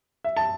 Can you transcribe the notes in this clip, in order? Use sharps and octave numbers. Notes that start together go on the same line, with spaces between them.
E5
A5